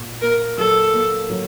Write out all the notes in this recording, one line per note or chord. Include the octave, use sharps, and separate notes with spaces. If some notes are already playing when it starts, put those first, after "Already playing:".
Already playing: A#2
A#3 A#4
F#3 A4
A#3
F#3